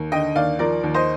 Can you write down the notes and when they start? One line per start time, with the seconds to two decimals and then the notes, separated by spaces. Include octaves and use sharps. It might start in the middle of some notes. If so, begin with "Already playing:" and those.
Already playing: D#2
0.12 D3 D#5 G5
0.36 D#2 D5 F5
0.59 F3 A#4 D5
0.83 D#2
0.94 C5 D#5